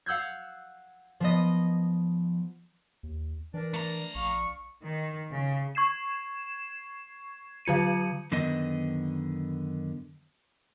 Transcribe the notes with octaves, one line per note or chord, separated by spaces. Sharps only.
F5 F#5 E6 G6 G#6
F3 B3 D#5
D#2
E3 D4 A#4 D5
A3 A#5
A#1 D5 F5 C#6
D#3
C#3
C#6 G#6 C7 E7
D3 F#3 F4 C#7 D#7
F#2 D3 D#3 B3 D#5